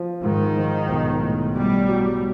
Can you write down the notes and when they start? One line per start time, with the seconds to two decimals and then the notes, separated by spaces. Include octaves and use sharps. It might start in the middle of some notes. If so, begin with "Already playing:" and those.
Already playing: F3
0.23 G#2 D#3
0.56 F3
0.88 B1
1.21 A2
1.54 B2 G3
1.88 F#3